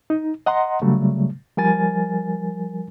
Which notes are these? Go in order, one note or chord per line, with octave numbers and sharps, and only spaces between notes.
D#4
D#5 F#5 A#5 C6
C#3 F#3 G3 A3
F3 G3 A#4 G#5 A6